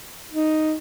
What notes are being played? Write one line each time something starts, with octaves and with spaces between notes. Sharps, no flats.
D#4